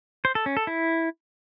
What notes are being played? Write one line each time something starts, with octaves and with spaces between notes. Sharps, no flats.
C5
A4
C#4
A4
E4